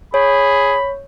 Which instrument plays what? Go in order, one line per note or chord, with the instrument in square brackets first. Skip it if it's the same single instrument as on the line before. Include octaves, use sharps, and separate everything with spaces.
[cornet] G#4 [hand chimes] C#5 [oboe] B5